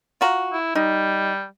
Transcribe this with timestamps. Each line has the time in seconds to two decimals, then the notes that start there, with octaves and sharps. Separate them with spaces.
0.21 F4 F#4 A#5
0.53 E4
0.75 G3 D#4